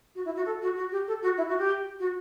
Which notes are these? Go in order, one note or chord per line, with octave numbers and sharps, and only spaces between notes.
F#4
E4
F#4
A4
F#4
F#4
G4
A4
F#4
E4
F#4
G4
F#4